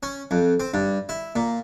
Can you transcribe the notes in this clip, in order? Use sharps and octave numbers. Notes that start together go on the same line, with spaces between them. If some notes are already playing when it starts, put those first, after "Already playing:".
C#4
F2
C4
G2
E4
A#2